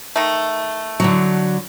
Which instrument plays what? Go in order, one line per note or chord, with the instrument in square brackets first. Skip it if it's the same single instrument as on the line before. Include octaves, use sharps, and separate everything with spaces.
[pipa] D#3 A3
[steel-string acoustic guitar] D3 F#3